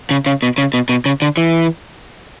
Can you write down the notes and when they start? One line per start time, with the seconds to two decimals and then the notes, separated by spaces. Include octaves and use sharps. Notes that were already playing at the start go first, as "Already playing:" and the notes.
0.11 C#3
0.26 C#3
0.42 B2
0.58 C#3
0.74 B2
0.89 B2
1.06 C#3
1.22 D3
1.37 E3